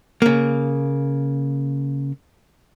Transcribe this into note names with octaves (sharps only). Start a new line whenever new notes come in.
C#3 A#3